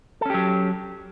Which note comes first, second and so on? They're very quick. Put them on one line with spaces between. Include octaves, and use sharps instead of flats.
A4 C#4 G4 F#3